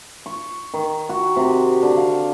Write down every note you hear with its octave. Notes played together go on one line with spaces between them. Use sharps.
C#6
D#3
F#4
C3
D3
F5